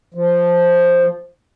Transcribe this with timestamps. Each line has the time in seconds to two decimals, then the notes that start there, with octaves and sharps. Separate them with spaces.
0.14 F3